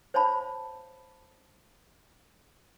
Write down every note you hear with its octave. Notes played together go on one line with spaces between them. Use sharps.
C5 C#5 F5 A5 B5